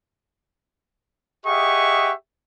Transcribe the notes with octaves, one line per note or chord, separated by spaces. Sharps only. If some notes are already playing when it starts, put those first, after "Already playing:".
G4 G#4 D#5 E5 F#5 C#6